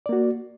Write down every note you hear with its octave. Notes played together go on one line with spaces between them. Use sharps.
A#3 F#4 D5